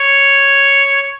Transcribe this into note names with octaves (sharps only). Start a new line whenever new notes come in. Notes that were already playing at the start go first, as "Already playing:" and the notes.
Already playing: C#5